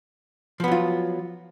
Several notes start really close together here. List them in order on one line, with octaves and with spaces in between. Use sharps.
F3 B3 F#3 F4